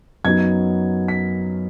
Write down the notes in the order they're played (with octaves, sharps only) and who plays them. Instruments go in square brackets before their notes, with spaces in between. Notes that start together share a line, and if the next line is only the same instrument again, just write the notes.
[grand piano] F#2 F#3 B3 D#4 G#6
B6